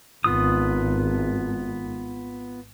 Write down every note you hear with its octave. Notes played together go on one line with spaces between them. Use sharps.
G#1 B3 F4 D#6